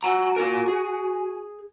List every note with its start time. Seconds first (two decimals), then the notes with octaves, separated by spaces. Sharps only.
0.03 F#4 F#5 G#5 A#5
0.36 F4 A#4
0.68 G#4